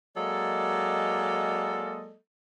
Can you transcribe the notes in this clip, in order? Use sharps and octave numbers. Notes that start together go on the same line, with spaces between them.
F#3 G#3 A#3 A4 D5 D#5